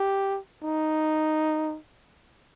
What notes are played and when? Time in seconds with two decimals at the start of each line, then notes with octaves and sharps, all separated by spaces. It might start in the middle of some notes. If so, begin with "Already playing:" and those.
Already playing: G4
0.63 D#4